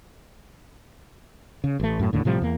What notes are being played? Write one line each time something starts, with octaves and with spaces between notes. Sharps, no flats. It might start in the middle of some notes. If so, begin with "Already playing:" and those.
C#3
A1 A3
F#2 A2
D#2 A2 D3
A2 C3 F3 G3
E2 A#3